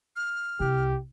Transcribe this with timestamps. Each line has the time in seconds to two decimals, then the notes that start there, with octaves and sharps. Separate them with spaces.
0.16 F6
0.60 C2 G4